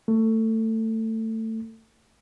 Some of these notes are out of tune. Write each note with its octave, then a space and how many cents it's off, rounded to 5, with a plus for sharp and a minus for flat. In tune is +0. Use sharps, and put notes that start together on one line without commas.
A3 +20